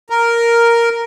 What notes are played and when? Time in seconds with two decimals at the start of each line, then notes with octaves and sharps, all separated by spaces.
0.10 A#4